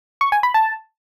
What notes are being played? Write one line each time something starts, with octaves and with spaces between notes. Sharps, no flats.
C#6
G#5
B5
A5